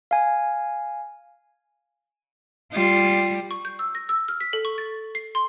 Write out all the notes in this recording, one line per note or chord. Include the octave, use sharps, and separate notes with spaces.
F5 G#5
G3 F4
C#6
G6
E6
A#6
E6
F6
B6
A4
C#6
A6
C7
C6